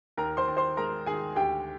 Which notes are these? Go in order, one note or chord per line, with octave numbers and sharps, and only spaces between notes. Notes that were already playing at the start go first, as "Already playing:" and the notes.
D#2 A#4 A#5
C5 C6
D#2
C5 C6
G#3 A#4 A#5
D#3 G#4 G#5
D2 G4 G5